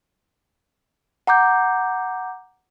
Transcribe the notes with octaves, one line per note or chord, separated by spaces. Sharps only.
F#5 A#5 D6 G6